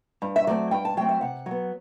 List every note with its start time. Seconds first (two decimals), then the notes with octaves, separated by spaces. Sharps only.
0.22 G2
0.36 E5
0.47 F#3 A3 C4 D5
0.71 G2 G5
0.85 A5
0.97 F#3 A3 C4 G5
1.09 E5
1.21 C3 F#5
1.46 F#3
1.51 B3